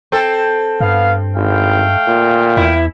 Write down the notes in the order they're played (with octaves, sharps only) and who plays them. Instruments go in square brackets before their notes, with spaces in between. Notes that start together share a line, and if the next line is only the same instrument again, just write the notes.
[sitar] C4 A4
[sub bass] G2 [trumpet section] B3 F5
[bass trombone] G#1 [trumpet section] A3 F5 G5
[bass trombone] A#2
[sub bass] E2 [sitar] E3 E4